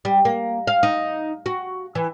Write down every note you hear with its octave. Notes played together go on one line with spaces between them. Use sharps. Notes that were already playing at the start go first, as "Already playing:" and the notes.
G3
A#3
F5
D#4
F#4
E3